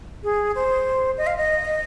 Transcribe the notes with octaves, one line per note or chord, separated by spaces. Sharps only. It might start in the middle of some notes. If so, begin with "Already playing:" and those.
G#4
C5
D#5
F5
D#5